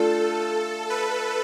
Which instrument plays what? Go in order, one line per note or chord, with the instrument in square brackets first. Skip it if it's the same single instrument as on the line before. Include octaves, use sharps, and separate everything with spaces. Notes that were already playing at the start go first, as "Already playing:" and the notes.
Already playing: [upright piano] A3 D4 F4 [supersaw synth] A4
[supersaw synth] B4